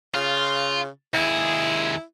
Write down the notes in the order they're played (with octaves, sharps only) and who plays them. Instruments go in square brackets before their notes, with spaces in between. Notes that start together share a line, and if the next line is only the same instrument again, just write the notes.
[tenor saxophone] C#3 [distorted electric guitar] F4
[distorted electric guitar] D#2 G#4 [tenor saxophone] E4